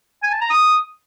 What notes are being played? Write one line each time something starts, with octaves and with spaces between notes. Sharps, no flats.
G#5
A5
A#5
D#6